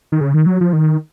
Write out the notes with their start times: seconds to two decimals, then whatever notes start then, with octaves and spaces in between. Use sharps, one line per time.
0.12 D#3
0.21 C#3
0.34 D#3
0.46 F#3
0.61 F3
0.73 D#3